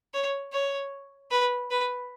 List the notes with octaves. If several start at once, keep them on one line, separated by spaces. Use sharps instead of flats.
C#5
C#5
B4
B4